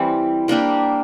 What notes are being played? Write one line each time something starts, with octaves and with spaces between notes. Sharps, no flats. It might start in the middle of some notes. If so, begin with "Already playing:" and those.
Already playing: E3 G3 C4
G3 A#3 D4 G4